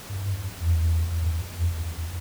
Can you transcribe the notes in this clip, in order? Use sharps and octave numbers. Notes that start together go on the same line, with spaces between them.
G2
F2
E2
E2
G2
F2
E2
E2
F2